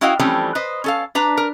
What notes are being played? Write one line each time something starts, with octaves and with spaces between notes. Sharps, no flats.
C#4 E4 F#4 D#5 F5 G5
E3 F3 G3 A3 C4 C#4
B4 C5 D#5
C#4 A4 F5
D4 B4 A#5
A#4